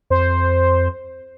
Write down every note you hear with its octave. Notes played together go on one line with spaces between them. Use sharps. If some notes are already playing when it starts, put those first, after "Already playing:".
F2 C5